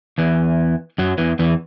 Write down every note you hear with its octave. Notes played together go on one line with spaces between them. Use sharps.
E2 E3
F#2 F#3
E2 E3
E2 E3